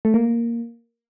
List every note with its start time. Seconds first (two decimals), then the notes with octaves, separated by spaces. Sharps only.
0.05 A3
0.14 A#3